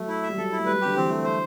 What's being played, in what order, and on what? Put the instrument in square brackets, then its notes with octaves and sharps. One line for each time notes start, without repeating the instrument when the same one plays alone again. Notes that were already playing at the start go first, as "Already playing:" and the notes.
Already playing: [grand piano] F#3 [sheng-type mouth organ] A3
[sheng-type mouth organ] E4
E5
[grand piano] G3
[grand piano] F#3 [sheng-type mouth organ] A4
[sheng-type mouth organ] E4
[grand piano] A3
[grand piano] G3 [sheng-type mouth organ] B4
[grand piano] F#3
[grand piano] D3 [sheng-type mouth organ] G4
[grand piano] E3 [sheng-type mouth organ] C4
[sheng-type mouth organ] A3
C5